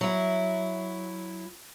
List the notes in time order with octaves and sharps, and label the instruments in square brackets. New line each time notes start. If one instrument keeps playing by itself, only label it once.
[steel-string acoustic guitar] F#3 E4